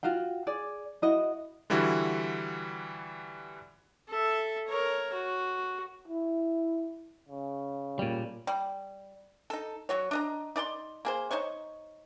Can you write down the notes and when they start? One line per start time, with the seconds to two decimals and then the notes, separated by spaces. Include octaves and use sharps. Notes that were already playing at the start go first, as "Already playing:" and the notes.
0.03 F4 F#4 F5 G5
0.47 G#4 D5
1.02 E4 F#4 D#5
1.70 D3 E3 G3 E4 F#4
4.08 A4 E5
4.67 A#4 C#5
5.13 F#4
6.08 E4
7.28 C#3
7.99 A#2 G3
8.47 G3
9.50 D#4 A4
9.89 F#3 F#4 C#5
10.11 D4 D#5 A#5
10.56 D#4 D5 A#5 C6
11.05 A#3 G#4 C5
11.31 D#4 C5 C#5 C#6